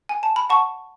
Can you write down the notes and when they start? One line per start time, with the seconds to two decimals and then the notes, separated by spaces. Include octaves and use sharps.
0.09 G#5
0.23 A5
0.36 B5
0.50 F#5 A5 C#6